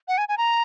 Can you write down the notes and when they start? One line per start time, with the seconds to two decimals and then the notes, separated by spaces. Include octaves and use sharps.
0.08 F#5
0.18 G#5
0.29 G#5
0.38 A#5